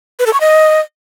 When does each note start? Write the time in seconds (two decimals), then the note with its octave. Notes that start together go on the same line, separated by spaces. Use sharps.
0.19 B4
0.26 A4
0.33 C#6
0.40 D#5